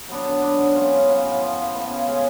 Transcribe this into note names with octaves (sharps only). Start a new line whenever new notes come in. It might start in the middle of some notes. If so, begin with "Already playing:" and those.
F#3 B3 D4
D3
F#3 B3 D4
G#2
F#3 C#4 F4
G#2
F#3 C#4 F4
A2
F3 B3
A2
F3 B3
C#3
G#3 C#4 G#4